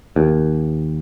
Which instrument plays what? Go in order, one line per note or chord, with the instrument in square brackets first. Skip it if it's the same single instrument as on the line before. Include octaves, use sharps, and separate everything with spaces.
[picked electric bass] D#2